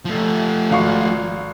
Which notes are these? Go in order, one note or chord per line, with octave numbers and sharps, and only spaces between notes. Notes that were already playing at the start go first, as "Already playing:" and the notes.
F3 A3
G#1 F5 C#6